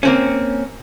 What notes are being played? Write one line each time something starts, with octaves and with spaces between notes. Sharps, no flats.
A#3 C4 C#4